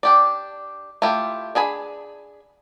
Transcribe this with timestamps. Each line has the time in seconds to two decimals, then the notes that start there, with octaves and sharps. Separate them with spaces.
0.03 D4 G4 D5
1.02 A3 E4 F4 G4
1.55 D4 G#4 G#5 B5